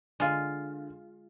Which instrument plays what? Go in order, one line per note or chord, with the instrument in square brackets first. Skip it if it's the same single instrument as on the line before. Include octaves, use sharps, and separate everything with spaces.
[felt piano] D3 [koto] G#3 F4